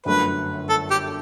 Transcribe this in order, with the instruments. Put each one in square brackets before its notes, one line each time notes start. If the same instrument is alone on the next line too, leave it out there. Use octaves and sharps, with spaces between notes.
[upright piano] G1 F#2 D3 A3 [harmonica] B4
[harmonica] A4
G4